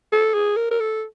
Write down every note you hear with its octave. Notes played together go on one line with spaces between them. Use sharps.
A4
G#4
A#4
A#4
A4